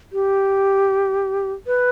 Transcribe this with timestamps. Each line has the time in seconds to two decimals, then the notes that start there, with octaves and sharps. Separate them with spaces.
0.13 G4
1.67 B4